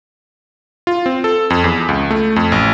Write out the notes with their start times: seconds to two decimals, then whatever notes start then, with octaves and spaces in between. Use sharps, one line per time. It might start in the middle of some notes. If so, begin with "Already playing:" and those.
0.87 F4
1.06 C4
1.24 A4
1.50 F2
1.64 E2
1.88 C#2
2.11 A3
2.36 F2
2.52 A1